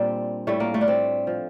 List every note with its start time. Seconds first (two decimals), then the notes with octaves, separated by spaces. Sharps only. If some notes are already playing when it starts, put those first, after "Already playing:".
Already playing: A#2 G3 C4 D4
0.47 A2 G3 A3
0.60 A#3
0.74 A3
0.81 D4
0.88 C4
1.27 F3